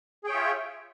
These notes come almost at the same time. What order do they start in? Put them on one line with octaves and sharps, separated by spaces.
G#4 G5 C#5 E5 F4